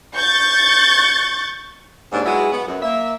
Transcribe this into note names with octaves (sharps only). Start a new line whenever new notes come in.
C#6 G6 A6
D#2 G#2 D4
F#3 G#3 B3 E4 F#4 G#4
B3
F#2
A#3 E5